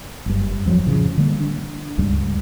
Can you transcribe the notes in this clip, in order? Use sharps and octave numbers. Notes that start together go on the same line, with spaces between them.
F#1 G2
F2 F3 F#3
A2 C#3 F3
D3 D#3 G3 A#3
D4
D1 C#2 G2 G3